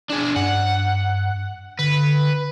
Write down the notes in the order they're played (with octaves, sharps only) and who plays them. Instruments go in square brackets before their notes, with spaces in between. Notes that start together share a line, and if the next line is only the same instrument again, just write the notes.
[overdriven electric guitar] D4 G#4
[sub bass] G2 [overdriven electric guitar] F#5
[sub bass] D3 [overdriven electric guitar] B4